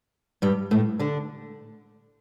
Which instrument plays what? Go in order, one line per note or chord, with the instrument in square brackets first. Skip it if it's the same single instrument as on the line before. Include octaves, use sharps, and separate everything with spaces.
[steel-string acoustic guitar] G2 G3
A2 A3
D3 D4